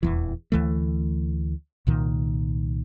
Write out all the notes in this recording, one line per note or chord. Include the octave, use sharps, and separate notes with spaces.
D#1 E2 E3
D2 E3 A3
C2 A#2 D#3